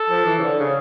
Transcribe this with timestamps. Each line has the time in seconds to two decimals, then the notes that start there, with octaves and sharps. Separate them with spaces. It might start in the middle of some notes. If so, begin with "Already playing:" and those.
Already playing: A4
0.10 F3
0.26 E3
0.38 C#3
0.43 D3
0.59 C#3